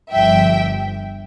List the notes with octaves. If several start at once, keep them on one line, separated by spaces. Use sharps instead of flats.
G1 G2 F3 E5 G5